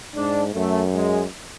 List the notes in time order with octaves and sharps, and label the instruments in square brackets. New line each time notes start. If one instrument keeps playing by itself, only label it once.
[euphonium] G#2 [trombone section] D4
[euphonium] F#2 [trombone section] A3
[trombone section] G#3